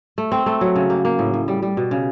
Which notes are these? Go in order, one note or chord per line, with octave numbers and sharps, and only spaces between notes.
A3
C4
A3
F#3
C#3
A#3
A#3
A2
A2
G3
G3
B2
C#3